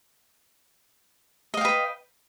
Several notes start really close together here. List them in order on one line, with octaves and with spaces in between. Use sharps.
D#5 F5 G5 B4